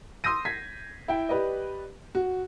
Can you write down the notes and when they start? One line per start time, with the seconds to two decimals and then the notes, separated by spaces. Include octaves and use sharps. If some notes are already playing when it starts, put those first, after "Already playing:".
0.24 C6 D#6 E6 G6 A#6 D#7
0.45 G#6 B6 C7
1.08 E4 G5
1.29 G4 B4 D5 D#5
2.15 F#4